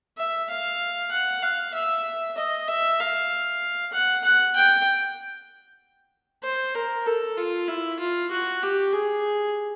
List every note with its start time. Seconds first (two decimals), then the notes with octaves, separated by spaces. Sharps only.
0.18 E5
0.50 F5
1.11 F#5
1.43 F5
1.74 E5
2.37 D#5
2.68 E5
3.00 F5
3.93 F#5
4.24 F#5
4.56 G5
6.44 C5
6.75 A#4
7.06 A4
7.37 F4
7.68 E4
8.00 F4
8.31 F#4
8.62 G4
8.93 G#4